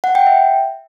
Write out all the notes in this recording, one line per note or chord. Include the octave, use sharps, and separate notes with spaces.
F#5
G5
E5